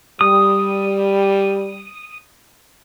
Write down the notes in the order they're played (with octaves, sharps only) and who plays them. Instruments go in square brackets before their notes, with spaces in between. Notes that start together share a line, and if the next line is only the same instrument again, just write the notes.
[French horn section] G3 [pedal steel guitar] D#6